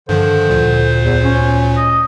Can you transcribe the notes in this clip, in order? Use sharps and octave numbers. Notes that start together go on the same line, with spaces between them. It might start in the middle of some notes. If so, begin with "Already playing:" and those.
G2 D3 D#3 F3 C5
D2 A#2
E2
C#4
D#5